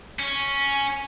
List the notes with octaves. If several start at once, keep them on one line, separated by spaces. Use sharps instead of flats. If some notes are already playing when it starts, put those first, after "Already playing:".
C#4 C#5